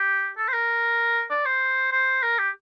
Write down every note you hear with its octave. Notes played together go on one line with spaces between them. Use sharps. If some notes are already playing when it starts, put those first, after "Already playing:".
Already playing: G4
A4
C5
A#4
D5
C5
C5
A#4
G4